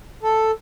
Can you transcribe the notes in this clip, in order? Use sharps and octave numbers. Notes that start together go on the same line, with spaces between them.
A4